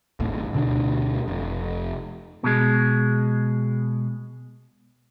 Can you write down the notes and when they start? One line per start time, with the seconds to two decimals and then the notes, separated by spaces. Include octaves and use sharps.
0.20 G#1 D#2 A2
0.53 D2 B2 D3 D4
1.28 F1
2.44 B2 G#3